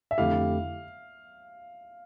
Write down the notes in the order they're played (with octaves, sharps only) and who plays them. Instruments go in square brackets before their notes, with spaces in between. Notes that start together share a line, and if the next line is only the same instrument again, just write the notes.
[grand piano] E5
[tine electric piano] F2 D3 A3 E4 G4 [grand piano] F5